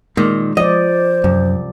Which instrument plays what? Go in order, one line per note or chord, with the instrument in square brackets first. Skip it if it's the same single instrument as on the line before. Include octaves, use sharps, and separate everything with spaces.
[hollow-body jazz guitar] A#2 D#3 [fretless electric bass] G#3
[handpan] F3 D5 [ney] C5 [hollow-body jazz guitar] D#5
[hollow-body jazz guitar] C2 [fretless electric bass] F#2